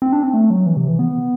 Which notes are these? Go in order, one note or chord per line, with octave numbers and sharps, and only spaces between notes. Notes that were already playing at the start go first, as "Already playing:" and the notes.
C4
D4
C4
A3
F#3
E3
C3
E3
B3